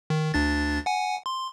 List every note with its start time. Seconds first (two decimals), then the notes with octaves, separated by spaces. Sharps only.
0.10 D#3
0.34 D2 D4 A6
0.86 F#5 G#5
1.26 C6